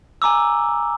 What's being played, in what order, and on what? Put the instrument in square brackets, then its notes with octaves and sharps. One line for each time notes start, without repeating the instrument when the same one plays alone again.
[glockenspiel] G#5 A#5 D6 E6